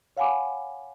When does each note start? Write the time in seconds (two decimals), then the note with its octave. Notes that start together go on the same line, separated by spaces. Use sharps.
0.17 C#5 F5 F#5 G#5 B5 D6